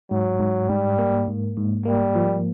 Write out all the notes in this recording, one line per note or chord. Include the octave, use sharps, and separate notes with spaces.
G#2 F#3
G#2
G#2 G3
A#3
G#2
G#2
G3 A#3
F3